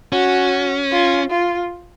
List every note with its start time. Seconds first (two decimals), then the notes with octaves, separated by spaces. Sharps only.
0.12 C#4 F#4
0.91 F4
1.30 F4